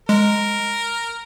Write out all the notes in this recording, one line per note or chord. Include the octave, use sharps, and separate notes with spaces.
G#3 A#4